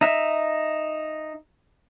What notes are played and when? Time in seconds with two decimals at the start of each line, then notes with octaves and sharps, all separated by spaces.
0.01 D#4 E5